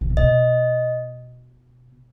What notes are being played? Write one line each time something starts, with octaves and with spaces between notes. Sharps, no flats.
C#3
C3
B2 D#5